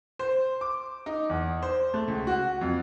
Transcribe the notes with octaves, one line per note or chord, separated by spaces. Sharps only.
C5
D6
D#4
E2
C5
A3
C#2
F#4
F2